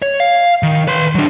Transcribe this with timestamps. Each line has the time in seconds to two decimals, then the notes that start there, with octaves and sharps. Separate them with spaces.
0.02 C#5
0.20 F5
0.63 D#3
0.88 B4 C6
1.15 F#3 D4